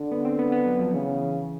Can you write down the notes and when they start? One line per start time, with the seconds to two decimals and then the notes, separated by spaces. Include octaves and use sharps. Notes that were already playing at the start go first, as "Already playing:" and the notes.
Already playing: D3
0.12 B3
0.25 C4
0.39 B3
0.52 B3
0.66 F#3
0.79 F3
0.93 C#3 E3